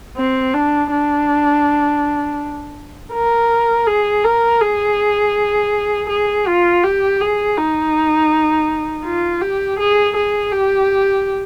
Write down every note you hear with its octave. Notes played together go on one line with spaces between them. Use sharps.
C4
D4
D4
A#4
G#4
A#4
G#4
G#4
F4
G4
G#4
D#4
F4
G4
G#4
G#4
G4